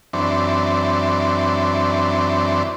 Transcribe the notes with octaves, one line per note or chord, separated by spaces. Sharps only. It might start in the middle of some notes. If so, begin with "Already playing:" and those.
F#2 E3 C4 D4